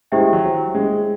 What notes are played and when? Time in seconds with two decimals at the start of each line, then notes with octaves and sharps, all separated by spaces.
0.12 G#3 E4 G4 C5 E5 G5
0.33 F#3
0.75 G#3